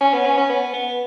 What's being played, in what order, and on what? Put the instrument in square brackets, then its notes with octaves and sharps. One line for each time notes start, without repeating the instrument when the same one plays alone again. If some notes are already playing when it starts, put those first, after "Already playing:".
[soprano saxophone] C#4
B3
C#4
C#4
B3
B3